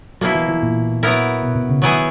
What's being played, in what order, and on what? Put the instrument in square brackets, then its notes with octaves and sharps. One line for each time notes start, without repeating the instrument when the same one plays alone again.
[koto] B2 A#3 E4 [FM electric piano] F#3
[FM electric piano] E3
E3
A#2
[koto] F#3 B3 E4 A#4
[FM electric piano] B2
B2
C#3
[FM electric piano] D#3 [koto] F#3 B3 E4 G#4